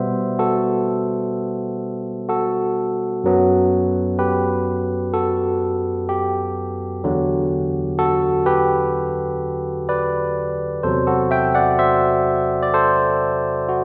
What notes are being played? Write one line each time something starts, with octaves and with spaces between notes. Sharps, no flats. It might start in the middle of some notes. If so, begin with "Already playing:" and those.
Already playing: B2 G3 B3 C5 E5
F#4 A4
F#4 A4
F#2 F#3 B3
G4 B4
F#4 A4
G4
E2 D3 F#3
F#4 A4
G4 B4
B4 D5
E2 C3 F#3 A4 C5
F#4 A4
E5 G5
D5 F#5
C5 E5
D5
A4 C5
F#4